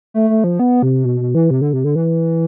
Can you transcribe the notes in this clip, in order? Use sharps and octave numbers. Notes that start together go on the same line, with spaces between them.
A3
A3
F3
B3
C3
B2
B2
E3
C3
D3
C3
D3
E3